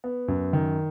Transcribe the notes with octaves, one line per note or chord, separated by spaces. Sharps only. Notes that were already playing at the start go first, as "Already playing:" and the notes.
B3
F#2
D#3